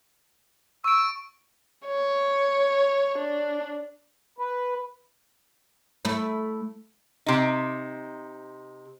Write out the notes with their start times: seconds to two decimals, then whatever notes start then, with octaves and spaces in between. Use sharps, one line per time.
0.84 C#6 E6 D7
1.87 C#5
3.19 D4
4.38 B4
6.05 A3 E4
7.26 C3 D#4